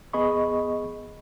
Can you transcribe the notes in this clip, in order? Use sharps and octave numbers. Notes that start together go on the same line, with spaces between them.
E2 B3 G#4 D#5 B5 C#6